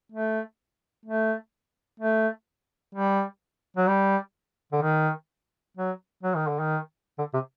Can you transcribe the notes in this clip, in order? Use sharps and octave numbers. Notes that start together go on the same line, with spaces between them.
A3
A3
A3
G3
F#3
G3
D3
D#3
F#3
F#3
D#3
D3
D#3
D3
C3